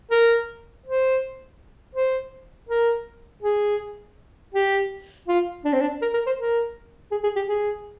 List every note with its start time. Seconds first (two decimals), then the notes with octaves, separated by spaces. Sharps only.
0.11 A#4
0.86 C5
1.95 C5
2.69 A#4
3.43 G#4
4.54 G4
5.28 F4
5.65 D4
5.73 C4
5.81 D4
6.02 A#4
6.14 A#4
6.26 C5
6.38 A#4
7.11 G#4
7.23 G#4
7.36 G4
7.49 G#4